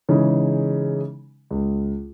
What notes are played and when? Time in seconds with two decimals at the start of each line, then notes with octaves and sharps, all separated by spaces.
0.09 C#3 E3 G#3 C#4 D#4
1.51 C#2